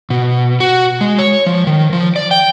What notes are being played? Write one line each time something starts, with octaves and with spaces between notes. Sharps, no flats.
B2
F#4
G#3
C#5
F3
D#3
F3
D5
G5